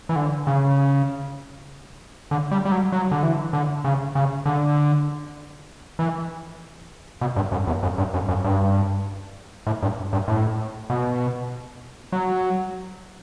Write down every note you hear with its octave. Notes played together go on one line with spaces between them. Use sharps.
E3
D3
C#3
D3
G3
G3
F#3
F#3
D3
E3
D3
C#3
C#3
D3
E3
B2
G2
F#2
E2
F#2
G2
F#2
F#2
G2
A2
G2
G2
A2
B2
F#3